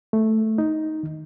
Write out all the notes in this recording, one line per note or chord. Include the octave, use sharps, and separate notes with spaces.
A3
D#4
D#3